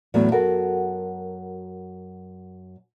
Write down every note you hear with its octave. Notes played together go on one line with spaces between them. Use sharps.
E2 A2 F#3 A3
F#2 F#4 A4 A#4